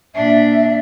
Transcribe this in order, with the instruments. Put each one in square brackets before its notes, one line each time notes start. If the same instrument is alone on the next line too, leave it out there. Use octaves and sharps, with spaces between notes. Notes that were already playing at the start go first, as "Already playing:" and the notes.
[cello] A#2 D4 [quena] E5